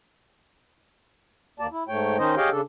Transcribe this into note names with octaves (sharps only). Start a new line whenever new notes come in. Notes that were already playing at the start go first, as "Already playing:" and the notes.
D#2 A#3 D5 A5
E4
G#2 A3 C#5 G5
D#3 C#4 D#4 C5 D#5
G4 G#4 C#5 D#5 F5 G5
C#3 D4 A4